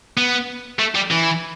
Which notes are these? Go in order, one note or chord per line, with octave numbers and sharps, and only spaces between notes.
B3
A3
G3
E3